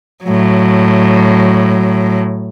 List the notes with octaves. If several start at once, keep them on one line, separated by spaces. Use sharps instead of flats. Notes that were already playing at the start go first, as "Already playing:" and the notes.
A2 F#3